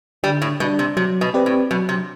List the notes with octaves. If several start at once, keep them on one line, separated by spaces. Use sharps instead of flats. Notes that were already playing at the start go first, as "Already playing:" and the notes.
D3 G3
A2
B2 G3 D4
C3
C3 F#3
B2
C4 G4 B4 D5
A2
B2 F#3
C3